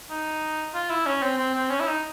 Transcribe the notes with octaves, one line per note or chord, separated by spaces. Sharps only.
D#4
F4
E4
C#4
C4
C4
C4
C#4
E4
D#4